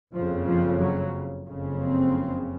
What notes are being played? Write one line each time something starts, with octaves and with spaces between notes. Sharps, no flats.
F#1 F2 C#3 F3
F3
F#3
F#1 F2 C#3
C4